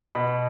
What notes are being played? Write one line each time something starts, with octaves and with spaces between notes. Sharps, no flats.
B2 B5